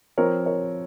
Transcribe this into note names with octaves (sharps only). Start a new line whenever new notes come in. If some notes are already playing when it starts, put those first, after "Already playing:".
F3 C4 A#4 C#5
A#4 C#5